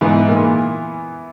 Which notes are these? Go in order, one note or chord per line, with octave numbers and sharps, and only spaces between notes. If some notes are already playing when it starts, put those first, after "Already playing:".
G#2 E3 B3 E4
A#2